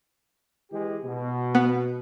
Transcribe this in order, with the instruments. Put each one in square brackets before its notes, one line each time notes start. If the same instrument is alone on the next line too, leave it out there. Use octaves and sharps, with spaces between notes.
[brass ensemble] E3 G#3 G4
B2
[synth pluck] B3